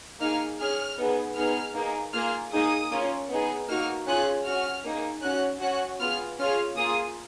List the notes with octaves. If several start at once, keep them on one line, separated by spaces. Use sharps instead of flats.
A#3 D#4 G#4 F6
C#4 G#4 F6
B3 D#4 G#4
B3 D#4 G#4 F6
A#3 D#4 G#4
A#3 F4 G#4 F6
A#3 D#4 G#4 D#6
A#3 C#4 F4
B3 D#4 G#4
A#3 D#4 F#4 F6
C#4 F4 G#4 F#6
C#4 F#4 F6
A#3 D#4 G#4
C#4 F#4 F#6
C#4 F#4 F#6
B3 F4 G#4 F6
C#4 F4 G#4 F6
A#3 F4 G#4 D#6